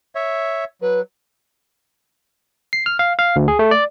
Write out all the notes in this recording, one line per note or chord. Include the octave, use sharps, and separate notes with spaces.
C#5 E5
F#3 B4
C7
F6
F5
F5
D2
G#4
A3
D5